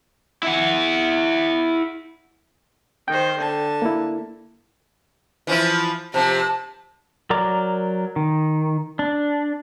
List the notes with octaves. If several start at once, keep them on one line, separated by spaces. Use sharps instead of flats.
E4 F#5
D#3 C5 G5
D3 A5
A#3 E4
E3 F3 E4
C3 F3 A5
F#3 A#4 D5 A#5 D6
D#3
D4